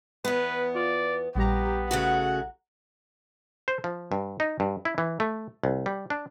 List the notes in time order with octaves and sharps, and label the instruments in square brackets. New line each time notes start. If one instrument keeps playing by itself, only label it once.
[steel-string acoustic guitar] E2 B3 [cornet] B4
[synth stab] F4 [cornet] D5
[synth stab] A#1 G3 A#5 [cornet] B3 [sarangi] G4
[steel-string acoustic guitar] C#3 A3 F#4 [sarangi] F#5
[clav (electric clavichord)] C5
F3
G2
D#4
G2
E4
E3
A3
C2
G3
D4